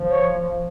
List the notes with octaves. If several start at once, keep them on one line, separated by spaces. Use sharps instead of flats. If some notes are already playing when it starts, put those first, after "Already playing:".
Already playing: F3
C#5